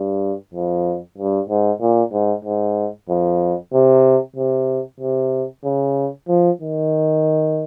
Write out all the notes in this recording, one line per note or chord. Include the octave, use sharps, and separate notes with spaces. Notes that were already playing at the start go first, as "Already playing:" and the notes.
Already playing: G2
F2
G2
G#2
A#2
G#2
G#2
F2
C3
C3
C3
C#3
F3
D#3